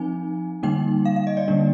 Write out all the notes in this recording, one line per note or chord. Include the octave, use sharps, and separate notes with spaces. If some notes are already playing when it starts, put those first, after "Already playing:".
Already playing: F3 C4 D#4 G#5
D3 G3 A#3 D#4 G5
F5
F5
D#5
D5
D3 G3 A#3 D4